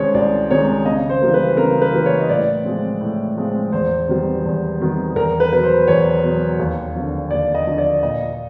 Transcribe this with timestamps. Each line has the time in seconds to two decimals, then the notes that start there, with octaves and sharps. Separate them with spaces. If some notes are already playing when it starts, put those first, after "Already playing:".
Already playing: C2 C3 D#3 G#3 C#4 C5 C#5
0.14 C2 D5
0.50 C3 D#3 G#3 C#4 C#5
0.85 C#3 D#5
1.09 C5
1.21 E3 G3 A#3
1.34 B4
1.57 C#3 A#4
1.82 B4
1.93 E3 G3 A#3
2.06 C#5
2.20 D#5
2.29 A2 D5
2.64 F3 G#3 C4
3.01 A2
3.37 F3 G#3 C4
3.72 E2 C5
4.08 C3 D#3 G3 B3
4.45 E2
4.80 C3 D#3 G3 B3
5.15 E2 A#4
5.40 B4
5.51 B2 F#3 B4
5.63 C5
5.88 E2 C#5
6.23 B2 F#3
6.59 D#2
6.95 D3 F3
7.30 D#2 D5
7.55 D#5
7.67 D3 F3
7.78 D5
8.02 A#2 D#5